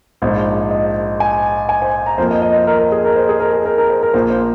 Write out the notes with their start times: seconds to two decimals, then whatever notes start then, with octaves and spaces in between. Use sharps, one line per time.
0.22 A#1 G#2 F3 C5
0.71 D#5
1.20 G#5
1.69 G#5
1.82 C5
2.06 A#5
2.18 F2 F3 A#3 C5
2.31 D#5
2.42 D#5
2.55 C5
2.67 A#4
2.79 A#4
2.92 G#4
3.04 A#4
3.16 C5
3.29 G#4
3.40 A#4
3.53 G#4
3.65 A#4
3.78 A#4
3.90 C5
4.02 A#4
4.14 A#1 A#2 A#3 C5
4.30 C5